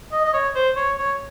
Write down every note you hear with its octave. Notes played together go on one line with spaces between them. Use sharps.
D#5
D#5
C#5
C5
C#5
C#5